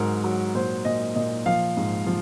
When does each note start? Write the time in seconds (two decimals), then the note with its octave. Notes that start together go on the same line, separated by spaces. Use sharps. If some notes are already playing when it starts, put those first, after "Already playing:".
Already playing: G#2 F#3 A#4
0.24 F#3
0.55 A#2 C5
0.85 A#2 D#5
1.16 A#2 D#5
1.46 F3 F5
1.77 G#2
2.06 F3